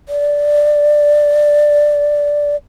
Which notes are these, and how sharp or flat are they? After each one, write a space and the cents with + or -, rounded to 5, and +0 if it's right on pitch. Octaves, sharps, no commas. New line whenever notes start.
D5 +5